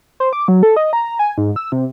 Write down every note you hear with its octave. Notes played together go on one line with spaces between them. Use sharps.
C5
D6
F#3
A4
D#5
A#5
G#5
G#2
E6
C3